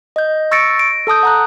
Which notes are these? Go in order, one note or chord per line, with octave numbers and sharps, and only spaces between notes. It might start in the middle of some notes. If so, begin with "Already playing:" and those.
D#5 G6
C#6 E6 A6 A#6 C#7 D7
D7
A4 A5 D#6 G6
F#5 A#5 F#6